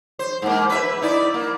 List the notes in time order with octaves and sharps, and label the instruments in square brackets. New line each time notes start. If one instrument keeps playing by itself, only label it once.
[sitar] C5
G#2 A#3
B4 E5
D#4 E4 D5
A#3